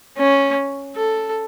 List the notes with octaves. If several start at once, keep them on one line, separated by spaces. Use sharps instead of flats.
C#4
A4